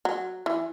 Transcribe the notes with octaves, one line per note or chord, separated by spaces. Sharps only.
F#3
E3